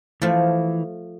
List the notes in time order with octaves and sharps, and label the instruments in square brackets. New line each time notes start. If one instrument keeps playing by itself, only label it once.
[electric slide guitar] E3 [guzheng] F3 A3